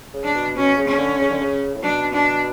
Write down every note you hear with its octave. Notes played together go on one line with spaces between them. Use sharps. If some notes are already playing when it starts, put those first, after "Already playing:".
C#3
D4
B2
B2 C#4
C#3
C#4
D3
C#3
D3
C#3
A2
B2 D4
D4